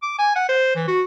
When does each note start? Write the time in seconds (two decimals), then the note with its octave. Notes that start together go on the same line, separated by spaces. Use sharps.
0.02 D6
0.19 G#5
0.36 F#5
0.49 C5
0.75 E3
0.88 F#4